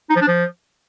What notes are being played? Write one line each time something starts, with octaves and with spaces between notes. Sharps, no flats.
D#4
F3
D4
F3